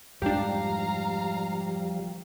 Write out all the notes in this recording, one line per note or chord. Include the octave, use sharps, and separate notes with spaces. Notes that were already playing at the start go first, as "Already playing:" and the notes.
F2 G#2 F3 G3 D4 G4 F5 A#5